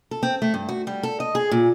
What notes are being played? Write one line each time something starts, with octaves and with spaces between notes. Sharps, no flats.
A4
C4
A3
G2
F#4
G3
A4
D#5
G#4
A#2